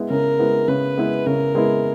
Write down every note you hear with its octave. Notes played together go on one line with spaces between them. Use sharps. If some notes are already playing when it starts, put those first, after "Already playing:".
Already playing: G#3 B3 E4
C#3 A#4
G#3 B3 E4
C#3 B4
G#3 B3 E4
C#3 A#4
G#3 B3 E4